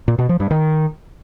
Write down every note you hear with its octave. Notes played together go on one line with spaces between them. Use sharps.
A#2
B2
F3
G2
D#3